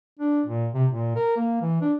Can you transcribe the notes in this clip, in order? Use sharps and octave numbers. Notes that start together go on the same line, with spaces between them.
D4
A#2
C3
A#2
A#4
A#3
E3
D4